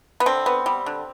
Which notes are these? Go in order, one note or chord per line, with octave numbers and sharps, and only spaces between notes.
B3
D3 C4
B3
G3
D3